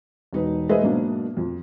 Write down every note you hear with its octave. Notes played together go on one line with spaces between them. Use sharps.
E1 D#4 B4
G#3 G#4 B4 C5 D#5 E5
G#2 B2 F#3 A#3 D4
F2